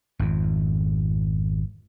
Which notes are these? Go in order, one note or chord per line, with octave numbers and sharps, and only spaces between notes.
G#1 F2